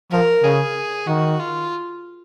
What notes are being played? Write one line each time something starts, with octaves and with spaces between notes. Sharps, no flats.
F3 A#4
C#3 G#4
D#3 F#4
F4